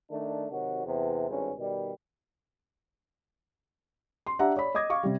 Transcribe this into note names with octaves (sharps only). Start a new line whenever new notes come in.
D#3 A3 D4
C3 D#3 F#3 F#4
E2 C3
G#1 G2 C#4
B2 D#3 G3
C6
D4 G4 E5 F#5 A#5
C#5 D5 B5
D#5 D6 D#6 G#6 A#6
F5 C#6 D6
C3 G3